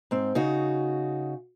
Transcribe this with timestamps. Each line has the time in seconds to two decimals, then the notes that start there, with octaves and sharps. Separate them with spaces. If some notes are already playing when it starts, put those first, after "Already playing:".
0.11 G#2 C4
0.35 C#3 D#4 F#4